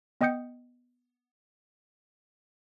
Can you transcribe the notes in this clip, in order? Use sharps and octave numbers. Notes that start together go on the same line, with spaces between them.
B3 D#5 G5 D#6 G6 C#7